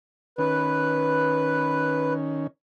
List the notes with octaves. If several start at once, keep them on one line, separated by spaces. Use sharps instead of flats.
D#3 C#4 B4